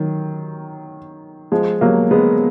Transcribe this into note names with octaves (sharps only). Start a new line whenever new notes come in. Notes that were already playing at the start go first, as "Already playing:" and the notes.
Already playing: D#3 F#3
F3 G#3
F#3 A#3
G#3 B3